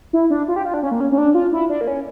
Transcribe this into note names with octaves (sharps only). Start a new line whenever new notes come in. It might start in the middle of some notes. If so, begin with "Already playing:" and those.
E4
D4
F4
G4
F4
D4
C#4
A#3
C#4
C#4
D4
F4
E4
D4
A#3
C#4